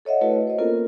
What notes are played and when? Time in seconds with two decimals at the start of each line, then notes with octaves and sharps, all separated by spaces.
0.05 A4 C#5 D#5 E5 F#5
0.21 A3 E4 F#4 A4 B4 C#5
0.34 D#5
0.47 C5 D#5
0.59 A#3 B3 C#4 F4 A4 A#4